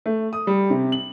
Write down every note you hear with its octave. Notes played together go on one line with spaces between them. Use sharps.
A3
D#6
G3
C3
F#7